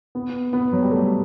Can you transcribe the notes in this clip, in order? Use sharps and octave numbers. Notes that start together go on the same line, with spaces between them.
B3
B3
F#3
G3
A3